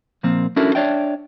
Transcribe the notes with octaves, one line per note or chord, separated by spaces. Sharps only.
A#2 F3 A#3 C4
C#4 D4 E4 F#4 A4 A#4
D4 C#5 D5 E5 G5